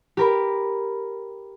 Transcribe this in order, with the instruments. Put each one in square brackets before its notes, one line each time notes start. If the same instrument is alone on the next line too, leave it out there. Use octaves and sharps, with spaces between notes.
[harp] G4 A#4 B5